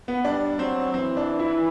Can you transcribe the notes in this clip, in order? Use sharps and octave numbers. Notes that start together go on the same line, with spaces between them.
B3
G3 D4
F#3 C4
E3 C4
D4
E4